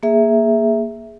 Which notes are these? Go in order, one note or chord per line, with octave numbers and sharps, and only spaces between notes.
A#3 G#4 E5